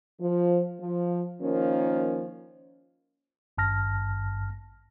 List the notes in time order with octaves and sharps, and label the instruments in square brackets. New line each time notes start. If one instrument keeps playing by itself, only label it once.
[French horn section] F3
F3
D#3 F3 A#3 C#4
[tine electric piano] G#1 G2 A5 F6 A#6